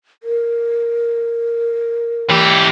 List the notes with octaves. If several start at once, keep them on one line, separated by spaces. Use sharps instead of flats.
A#4
E3 G4